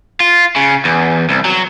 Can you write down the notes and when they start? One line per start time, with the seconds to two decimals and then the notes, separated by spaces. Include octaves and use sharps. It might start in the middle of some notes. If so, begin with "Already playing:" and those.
0.20 F4
0.56 C#3
0.85 E2
1.29 C2
1.45 F#3